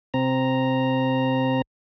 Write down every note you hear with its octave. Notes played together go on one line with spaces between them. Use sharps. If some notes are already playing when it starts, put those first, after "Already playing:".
C3 C4 A#5